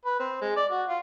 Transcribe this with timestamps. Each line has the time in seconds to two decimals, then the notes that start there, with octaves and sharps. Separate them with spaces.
0.05 B4
0.20 C4
0.42 G#3
0.56 D5
0.71 F#4
0.89 F4